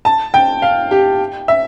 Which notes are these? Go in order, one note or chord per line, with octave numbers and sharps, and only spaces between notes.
A5
G5
F5
G4
E5